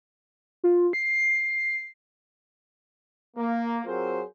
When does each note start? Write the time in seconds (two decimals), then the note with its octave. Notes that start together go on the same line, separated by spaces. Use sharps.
0.64 F4
0.93 C7
3.37 A#3
3.86 F#3 C4 F4 G#4 A#4 C5